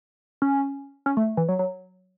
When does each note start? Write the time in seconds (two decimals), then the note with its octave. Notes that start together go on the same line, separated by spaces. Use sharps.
0.42 C#4
1.06 C#4
1.17 A3
1.37 E3
1.49 F#3
1.59 F#3